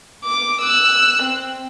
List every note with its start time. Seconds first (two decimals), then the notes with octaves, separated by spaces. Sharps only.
0.24 D6
0.62 E6 F#6
1.23 C4